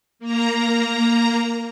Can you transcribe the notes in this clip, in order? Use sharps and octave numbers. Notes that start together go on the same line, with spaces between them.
A#3 A#5